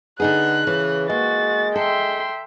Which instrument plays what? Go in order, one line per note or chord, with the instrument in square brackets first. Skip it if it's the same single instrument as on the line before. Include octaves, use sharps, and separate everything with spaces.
[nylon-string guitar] D3 D#4 G#4 [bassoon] B3 [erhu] F#6
[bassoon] C#3 [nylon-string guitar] E3
[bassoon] G#3 [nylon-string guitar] A#3 [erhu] F#4 [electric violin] A6
[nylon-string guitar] A4 [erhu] E5 [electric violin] G5 C6